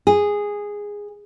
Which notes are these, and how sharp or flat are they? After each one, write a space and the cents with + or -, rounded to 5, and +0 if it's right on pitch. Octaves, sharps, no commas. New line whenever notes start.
G#4 -10